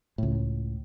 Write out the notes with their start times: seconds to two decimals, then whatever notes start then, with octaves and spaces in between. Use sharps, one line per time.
0.18 C#2 A2